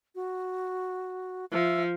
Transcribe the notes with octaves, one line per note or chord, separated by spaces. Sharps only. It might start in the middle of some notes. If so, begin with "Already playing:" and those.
F#4
F3 E5